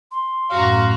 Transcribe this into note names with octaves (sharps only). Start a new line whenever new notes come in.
C6
F#2 A2 F#4 F5 A#5